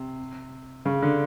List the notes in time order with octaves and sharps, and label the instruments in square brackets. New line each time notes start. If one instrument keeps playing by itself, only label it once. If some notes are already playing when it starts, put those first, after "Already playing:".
Already playing: [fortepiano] C3
C#3
D3